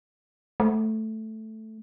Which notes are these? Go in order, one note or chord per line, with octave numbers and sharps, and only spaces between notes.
A3